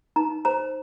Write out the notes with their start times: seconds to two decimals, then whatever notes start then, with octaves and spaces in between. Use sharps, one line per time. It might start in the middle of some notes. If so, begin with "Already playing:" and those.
0.16 D#4 A#5
0.45 C5 A#5